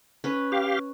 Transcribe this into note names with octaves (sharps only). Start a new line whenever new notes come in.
C#4 B4
G4 F5